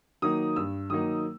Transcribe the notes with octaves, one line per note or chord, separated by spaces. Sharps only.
D#3 F#3 A#3 D#4 D#6
G2 E6
D#3 F#3 A#3 D#4 D#6